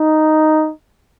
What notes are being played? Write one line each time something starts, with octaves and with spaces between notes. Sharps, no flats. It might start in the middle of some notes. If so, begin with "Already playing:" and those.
Already playing: D#4